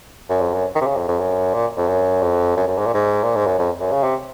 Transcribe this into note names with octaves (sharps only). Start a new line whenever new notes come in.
F#2
F2
F#2
D#3
C3
C#3
F2
F2
F#2
A#2
F2
F#2
F2
F#2
F#2
G#2
A#2
G#2
A#2
G#2
F#2
F2
F#2
C#3
C3